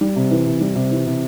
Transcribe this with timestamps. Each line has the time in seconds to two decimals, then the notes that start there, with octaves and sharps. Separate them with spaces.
0.01 G3
0.16 C3
0.31 E3
0.46 C3
0.61 G3
0.75 C3
0.91 E3
1.06 C3